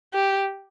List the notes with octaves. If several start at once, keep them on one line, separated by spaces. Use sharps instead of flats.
G4